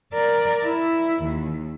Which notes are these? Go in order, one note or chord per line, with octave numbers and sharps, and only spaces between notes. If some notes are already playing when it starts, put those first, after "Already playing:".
A#4 D5
E4
D#2